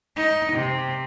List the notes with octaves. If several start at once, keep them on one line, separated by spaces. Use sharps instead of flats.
D#4
C3